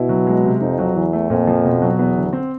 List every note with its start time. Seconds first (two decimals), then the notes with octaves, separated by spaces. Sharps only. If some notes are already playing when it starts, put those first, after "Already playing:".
Already playing: B2 E4
0.09 F#3
0.27 G#3
0.44 C3
0.60 F2 D#4
0.79 F#3
0.95 E2 E3
1.13 A3
1.30 F2 A#2
1.47 F3
1.64 B2
1.82 F#3
1.98 E2 B3
2.17 D3
2.33 C4